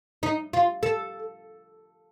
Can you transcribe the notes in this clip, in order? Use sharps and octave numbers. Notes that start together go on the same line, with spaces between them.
D#4
F4
A4